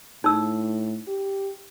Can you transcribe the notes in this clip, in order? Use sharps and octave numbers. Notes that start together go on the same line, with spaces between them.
A2 D#4 E6
G4